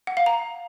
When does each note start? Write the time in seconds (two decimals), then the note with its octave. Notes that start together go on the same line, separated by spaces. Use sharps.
0.07 F#5
0.17 F5
0.26 A#5